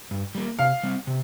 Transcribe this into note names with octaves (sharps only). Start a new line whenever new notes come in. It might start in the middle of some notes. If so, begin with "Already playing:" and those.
G2
G3 A#3
C3 F5
G3 C4
C3